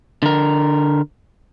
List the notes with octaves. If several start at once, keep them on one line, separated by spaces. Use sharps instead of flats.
D3 A#4